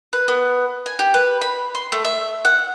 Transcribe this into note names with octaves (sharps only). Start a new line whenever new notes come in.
B4
B3
G#5
G4
B4
B5
C6
A3
E5
F#5